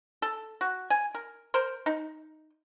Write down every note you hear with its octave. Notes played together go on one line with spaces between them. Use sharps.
A4
F#4
G#5
A#4
A#4 C5
D#4